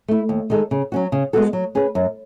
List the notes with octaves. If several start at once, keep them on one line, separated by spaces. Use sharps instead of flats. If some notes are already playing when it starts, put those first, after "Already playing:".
A3 E4
D#2
D#3 G#3 D#4 A4
C#3
F#3 C#4 F#4
C#3
G#3 B3 F#4 A4
F#3
C#4 G#4 B4
F#2